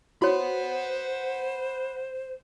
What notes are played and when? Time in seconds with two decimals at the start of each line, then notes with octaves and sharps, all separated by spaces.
0.22 F#4 C5 C#5 F#5 B5